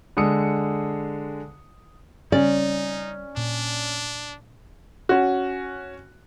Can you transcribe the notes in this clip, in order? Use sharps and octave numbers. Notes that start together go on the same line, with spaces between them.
D3 G#3 D#6 C#7
C#3 G3 C4 C#4 D#4 D5
A#2 D4
C#4 F#4